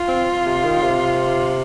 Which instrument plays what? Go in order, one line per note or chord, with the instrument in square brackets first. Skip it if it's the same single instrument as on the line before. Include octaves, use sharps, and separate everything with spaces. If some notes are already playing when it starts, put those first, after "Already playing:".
Already playing: [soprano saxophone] F4
[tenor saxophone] C4
C3
D#3
C3